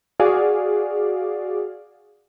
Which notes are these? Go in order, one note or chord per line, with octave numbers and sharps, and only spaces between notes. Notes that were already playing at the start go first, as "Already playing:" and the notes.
F#4 G#4 D5 F5